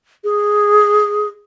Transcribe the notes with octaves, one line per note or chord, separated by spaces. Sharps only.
G#4